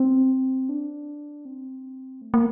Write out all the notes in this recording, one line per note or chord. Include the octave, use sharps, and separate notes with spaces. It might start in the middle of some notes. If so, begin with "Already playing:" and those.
Already playing: C4
D4
C4
A3
A#3